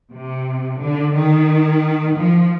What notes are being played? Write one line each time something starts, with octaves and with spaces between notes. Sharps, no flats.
C3
D3
D#3
F3